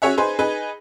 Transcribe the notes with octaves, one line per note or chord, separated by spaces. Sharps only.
C#4 F#4 G#4 C#5 E5 F#5
D#4 G#4 B4 C5
D#4 G#4 B4